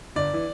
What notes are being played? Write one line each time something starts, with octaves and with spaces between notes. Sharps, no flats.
G1 D5
E3